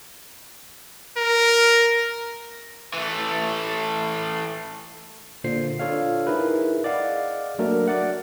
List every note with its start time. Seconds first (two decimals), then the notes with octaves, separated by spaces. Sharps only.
1.17 A#4
2.94 E3 A3
5.44 A#2 D3 C5 C7
5.79 D4 F4 A4 C#5 F5
6.27 D#4 E4 G#4 A#4 B4
6.83 G#4 D5 D#5 F5 F#5
7.59 F#3 A3 A#3 D4 F#4 A#4
7.88 D5 F#5